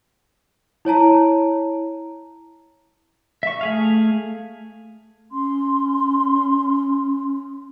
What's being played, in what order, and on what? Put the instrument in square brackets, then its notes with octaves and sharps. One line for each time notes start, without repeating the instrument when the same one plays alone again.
[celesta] E4 C#5 A5 A#5
[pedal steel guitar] E5 C#6
A3 G#4 F5
[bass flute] C#4 [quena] C6